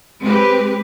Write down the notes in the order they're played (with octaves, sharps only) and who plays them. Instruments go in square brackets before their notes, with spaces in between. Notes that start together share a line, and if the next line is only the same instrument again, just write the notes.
[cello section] G#3 C4 G4 B4